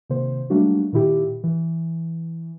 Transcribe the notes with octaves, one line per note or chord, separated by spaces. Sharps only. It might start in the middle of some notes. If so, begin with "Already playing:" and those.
C3 D#3 A#3 C5
F#3 G3 A3 A#3 D4 F#4
A#2 D#3 E4 G4
E3